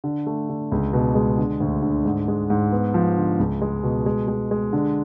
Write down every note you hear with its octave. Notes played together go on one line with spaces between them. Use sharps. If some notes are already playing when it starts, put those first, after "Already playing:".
D3
A3
D3
C#2
B2
G#3
D3
D2
D3
G#2
G#3
G#2
B3
F3
D3
C#2
G#3
B2
G#3
G#3
G#3
D3